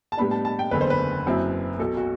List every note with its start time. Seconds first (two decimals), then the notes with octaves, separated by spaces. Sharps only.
0.12 A5
0.17 A2 G3 B3 D4 B5
0.31 A5
0.45 A5
0.59 G5
0.71 F#1 E2 D3 B4
0.81 C5
0.90 B4
1.26 F#1 F#2 F#3 C4 E4
1.79 B1 B2 F#3 A4
1.97 F#4